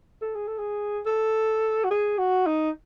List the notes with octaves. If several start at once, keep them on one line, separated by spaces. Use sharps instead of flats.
A4
G#4
A4
G#4
A4
F#4
G#4
F#4
D#4